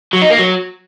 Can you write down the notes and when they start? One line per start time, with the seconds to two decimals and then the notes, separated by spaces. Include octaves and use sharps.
0.13 F#3
0.22 D#4
0.30 A#3
0.39 F#3